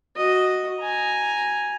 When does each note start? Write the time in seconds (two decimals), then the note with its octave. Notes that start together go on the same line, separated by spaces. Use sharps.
0.16 F#4 D#5
0.80 G#5 A#5